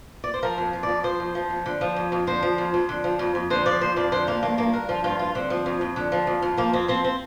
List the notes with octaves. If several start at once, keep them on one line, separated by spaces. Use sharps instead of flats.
D5
C5
F3 A#4
F2
F3
D5
F2
F3 C5
F2
F3
F2
D3
F3
F2
F2
D3 C5
F3
F2
F2
D3
F3
F2
F2
D3 C5
F3 D5
F2 C5
F2 D5
D3 C5
F3 A#3
G2 A#3
G2 A#3
D3 A#4
F3 F4
G2 F4
G2 F4
D3 C4
F3
F2
F2
D3
F3
F2
F2
F3 A#3
F2 C4
F3 C4
C4